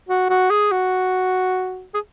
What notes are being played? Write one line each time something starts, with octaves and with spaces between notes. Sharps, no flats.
F#4
F#4
G#4
F#4
G#4